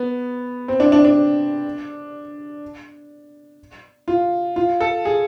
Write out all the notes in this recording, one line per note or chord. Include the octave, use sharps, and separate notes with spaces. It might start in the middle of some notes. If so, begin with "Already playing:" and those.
Already playing: B3
C4
D4
D4
D4
F4
F4
A4
G#4